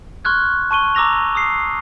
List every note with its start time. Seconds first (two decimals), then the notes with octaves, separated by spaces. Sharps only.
0.25 C6 C#6 F6 F#6 G#6
0.71 A5 C#6 D#7 G7
0.95 A#5 D6 E6 A#6 F7
1.35 D#6 C7